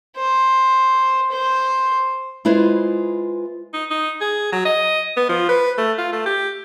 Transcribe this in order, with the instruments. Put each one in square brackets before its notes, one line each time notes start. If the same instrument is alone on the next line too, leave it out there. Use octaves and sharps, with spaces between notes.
[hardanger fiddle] C5
C5
[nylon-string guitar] G#3 E4 F4 B4 C5
[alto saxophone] D#4
D#4
G#4
F#3
D#5
B3
F3
B4
A3
F4
A3
G4